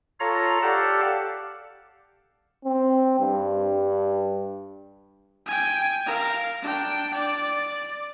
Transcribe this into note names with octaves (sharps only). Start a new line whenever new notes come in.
F4 A4 C#5 F5 A#5
G4 A4 D5 F5 F#5 A5
C4
G2
G5 G#5
A#4 F5
D4 G5
D5